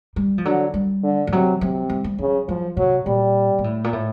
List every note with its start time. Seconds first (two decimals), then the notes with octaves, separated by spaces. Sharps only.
0.16 G3
0.38 F3
0.45 D3 F#3
0.74 G3
1.03 D3
1.27 F3
1.32 C3 F#3
1.61 C3 F#3
1.90 G3
2.04 G3
2.18 C#3 F#3
2.48 F3 F#3
2.77 C3 F#3
3.06 A#2 G3
3.59 A#2
3.64 A2
3.84 A#2
3.93 A2